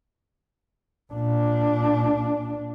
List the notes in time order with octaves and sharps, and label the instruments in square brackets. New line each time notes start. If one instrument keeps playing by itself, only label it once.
[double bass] A#2 D4